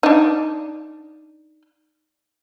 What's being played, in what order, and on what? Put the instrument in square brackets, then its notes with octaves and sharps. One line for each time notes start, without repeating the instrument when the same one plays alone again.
[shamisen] D4 D#4